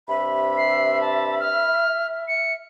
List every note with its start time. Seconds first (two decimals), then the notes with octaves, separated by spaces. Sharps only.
0.09 G2 C3 E5 B5
0.57 C7
1.01 A5
1.40 F6
2.28 C#7